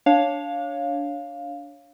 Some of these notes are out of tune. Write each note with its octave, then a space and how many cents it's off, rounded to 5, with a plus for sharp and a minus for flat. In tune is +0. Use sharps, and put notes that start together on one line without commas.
D4 -15 C#5 +0 F5 +0